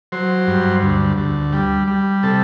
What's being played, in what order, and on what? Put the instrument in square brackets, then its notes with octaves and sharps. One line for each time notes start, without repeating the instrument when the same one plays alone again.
[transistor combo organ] F#3 C5
G2
D2
D2
G3
G3
C3 A4